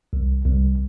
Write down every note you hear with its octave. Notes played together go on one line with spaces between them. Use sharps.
C2
C2